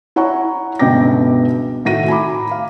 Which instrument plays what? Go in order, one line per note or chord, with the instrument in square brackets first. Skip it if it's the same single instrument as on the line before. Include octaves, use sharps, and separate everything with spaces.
[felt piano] E4 C#5 F#5 G#5 A#5 C#6
G1 C#2 B2 G5 D6 A#6
A2 D#3 F#4 A#6 D#7
G#5 A#5 B5 D6
F5